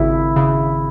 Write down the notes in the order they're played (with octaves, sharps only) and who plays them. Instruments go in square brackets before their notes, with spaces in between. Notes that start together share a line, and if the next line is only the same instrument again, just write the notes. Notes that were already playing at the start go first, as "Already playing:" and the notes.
Already playing: [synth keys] G#1 C#3 [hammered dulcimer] E4
[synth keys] C#3